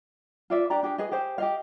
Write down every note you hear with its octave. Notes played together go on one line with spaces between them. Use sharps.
F4 D5 E5
D4 G4 D5 A#5
D4 G4 G#4 G5
G#4 B4 D#5
G4 G#4 C5 F5
G4 D#5 F5